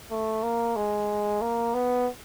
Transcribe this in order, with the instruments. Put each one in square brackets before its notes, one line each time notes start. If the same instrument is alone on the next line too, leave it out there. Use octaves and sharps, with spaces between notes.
[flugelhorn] A3
A#3
G#3
A#3
B3